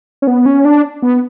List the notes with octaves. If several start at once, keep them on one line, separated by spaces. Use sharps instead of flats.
C#4
B3
C#4
D4
B3